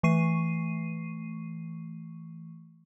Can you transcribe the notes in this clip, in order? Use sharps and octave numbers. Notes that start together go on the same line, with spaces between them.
E3 A3 C#6 C7 D#7